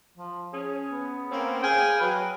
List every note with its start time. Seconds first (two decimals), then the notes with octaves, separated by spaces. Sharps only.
0.18 F3
0.53 C#4 G#4
0.91 B3
1.31 A#3 C4 C#4
1.63 G#4 F5 G5 G#5
2.00 F#3 B4